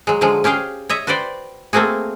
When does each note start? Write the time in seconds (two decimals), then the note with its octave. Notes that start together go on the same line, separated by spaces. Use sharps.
0.07 F#3 G#3
0.21 D3 F3 F#3 G#3
0.44 C#4 G4 G#4 F5 G5
0.89 C#5 D#5 E5
1.07 F#4 B4 C5 D5 G5
1.73 A3 A#3 C4 F#4 G#4